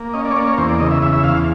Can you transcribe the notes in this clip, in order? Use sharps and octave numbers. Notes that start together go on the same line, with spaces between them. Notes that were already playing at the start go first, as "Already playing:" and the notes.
Already playing: A#3
C#4 D#5
D5
C#5
A#3 D5
C#5
E2 C5
D5
C#3 D#5
E5
E2 E5
E5
E2 F5